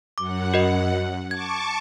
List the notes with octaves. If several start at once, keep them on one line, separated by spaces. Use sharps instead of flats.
F#2 F#5 D6
F#4 A#4 D#5
A5 C#6 D6 G#6